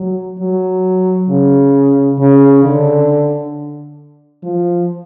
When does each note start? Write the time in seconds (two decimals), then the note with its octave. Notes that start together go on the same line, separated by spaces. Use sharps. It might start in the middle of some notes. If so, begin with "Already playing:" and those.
Already playing: F#3
0.39 F#3
1.29 C#3
2.19 C#3
2.64 D3
4.43 F3